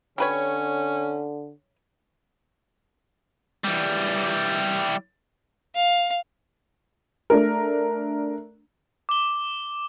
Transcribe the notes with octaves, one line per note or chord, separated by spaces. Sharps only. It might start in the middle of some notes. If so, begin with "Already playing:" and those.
D3 C#4 G4 B4 C#5
E3 G3
F5
A3 D4 A#4
D6 G7